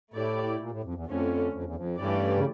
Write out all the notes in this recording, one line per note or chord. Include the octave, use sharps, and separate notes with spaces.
A2 A3 E4 G4 D5
A#2
A2
F2
E2
F2 D3 A3 C#4
F2
E2
F2
G2 E3 A3 C#4 G4 D5
C#3